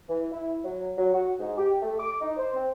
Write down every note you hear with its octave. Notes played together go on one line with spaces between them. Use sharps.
E3
E4
F#3
F#3
F#4
G#2
G4
A3
D6
D#4
C5
C4